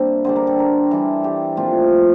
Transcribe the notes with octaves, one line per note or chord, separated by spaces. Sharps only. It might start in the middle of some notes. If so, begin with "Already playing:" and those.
Already playing: C3 G3 A#3 D4 E4 D5
D3 G3 D4 C5
A#4
A4
A#4
E3 G3 D4 A4
G4
A#2 F3 A3 C4 F4